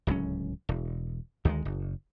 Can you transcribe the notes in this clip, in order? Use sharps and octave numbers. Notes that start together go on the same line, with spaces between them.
D1 C#2 F#3 C#4
E1
D2 D#3 E3 G#3
F#1